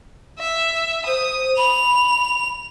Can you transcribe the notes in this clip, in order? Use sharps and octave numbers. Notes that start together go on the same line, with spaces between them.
E5
C5 D#6
B5 F7